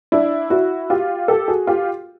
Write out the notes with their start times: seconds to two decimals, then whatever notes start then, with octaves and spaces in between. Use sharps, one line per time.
0.12 D4 E4
0.50 E4 F#4
0.90 F4 G4
1.28 G4 A4
1.48 F#4 G#4
1.67 F4 G4